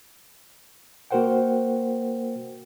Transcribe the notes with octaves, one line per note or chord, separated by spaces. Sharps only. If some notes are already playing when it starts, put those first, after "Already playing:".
A#3 F#4 A#4 C5 F#5 G5